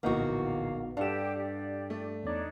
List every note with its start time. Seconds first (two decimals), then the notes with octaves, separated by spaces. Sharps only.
0.03 D1 A#1 E3 A#3 B3 D#4 F#4 C#6
0.43 F5
0.97 G2 D4 G4 A4 F5 F#5 E7
1.36 G4 D5
1.90 A3
2.24 E2 D4 D#4 C#5 D5